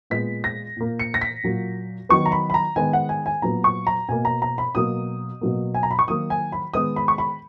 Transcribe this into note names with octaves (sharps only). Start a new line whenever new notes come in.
A#2 G#3 B3 B6
A#6
A#2 A#3
C#7
A#6
B6
A#2 F#3 A#3
D#3 F#3 B3 C#6
A#5
B5
B5
A#5
D#3 G#3 B3 G#5
F#5
G#5
G#5
A#2 F#3 B3 A#5
C#6
A#5
B2 A#3 G#5
A#5
A#5
B5
B2 F#3 A#3 D#6
B2 F#3 A#3
G#5
A#5
B5
C#6
D#3 F#3 A#3 D#6
G#5
B5
D#3 G#3 B3 D#6
B5
C#6
B5